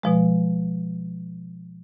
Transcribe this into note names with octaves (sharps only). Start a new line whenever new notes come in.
B2 F3 G#3